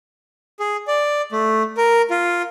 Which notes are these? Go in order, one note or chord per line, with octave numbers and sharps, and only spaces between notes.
G#4
D5
A3
A#4
F4